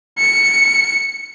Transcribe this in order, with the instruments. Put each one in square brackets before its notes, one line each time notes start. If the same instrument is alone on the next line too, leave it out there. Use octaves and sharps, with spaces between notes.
[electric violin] C#7